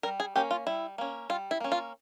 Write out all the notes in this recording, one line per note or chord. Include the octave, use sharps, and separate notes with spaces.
G3 A#4
G#4
A#3 C#4 G4
F4
G3 E4
A#3 C#4
G3 F4
E4
A#3 C#4
F4